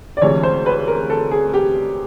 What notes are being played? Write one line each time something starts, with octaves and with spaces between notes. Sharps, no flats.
D5
D2 C3 E3 G#3 C#5
C5
B4
A#4
A4
G#4
G4